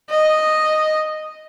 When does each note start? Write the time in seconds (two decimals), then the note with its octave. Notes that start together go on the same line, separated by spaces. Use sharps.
0.10 D#5